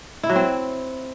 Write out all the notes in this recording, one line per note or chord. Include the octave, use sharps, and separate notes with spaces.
E4
F#3
C4